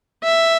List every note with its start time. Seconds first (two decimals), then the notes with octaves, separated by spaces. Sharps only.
0.24 E5